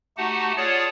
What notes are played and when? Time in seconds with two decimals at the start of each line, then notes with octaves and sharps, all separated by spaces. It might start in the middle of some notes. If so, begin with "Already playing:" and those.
0.17 A3 D#4 F#4 G4 F#5 A5
0.57 F4 G#4 C#5 D5 F#5 A5